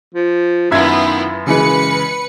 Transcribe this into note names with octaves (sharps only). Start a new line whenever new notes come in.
F3
F#2 D#3 B3 E4 F4 E5 G#6
F#2 C#3 E3 G#3 B4 C#7